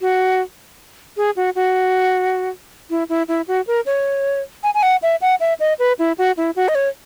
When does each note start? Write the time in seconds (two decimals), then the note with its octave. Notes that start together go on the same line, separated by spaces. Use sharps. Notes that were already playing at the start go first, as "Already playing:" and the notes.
0.01 F#4
1.17 G#4
1.36 F#4
1.55 F#4
2.90 E4
3.09 E4
3.28 E4
3.48 F#4
3.67 A#4
3.86 C#5
4.63 G#5
4.74 G#5
4.83 F#5
5.02 E5
5.22 F#5
5.40 E5
5.60 D#5
5.79 B4
5.99 E4
6.18 F#4
6.37 E4
6.56 F#4
6.68 D#5
6.75 C#5